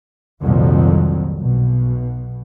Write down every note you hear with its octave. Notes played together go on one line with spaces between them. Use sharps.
C2 F2 A#2 D#3 F#3 G3
B1 B2